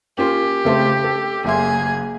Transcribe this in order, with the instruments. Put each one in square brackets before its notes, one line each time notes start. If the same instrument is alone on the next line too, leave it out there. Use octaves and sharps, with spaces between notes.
[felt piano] A#3 C#4 F4 [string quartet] G4
[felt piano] C#3 A3 C4
A4
[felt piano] F#1 E5 C6 [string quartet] A#3 G#4 G#6